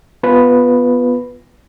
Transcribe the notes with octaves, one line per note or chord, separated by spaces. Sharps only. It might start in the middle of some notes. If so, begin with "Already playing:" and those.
B3 F4 B4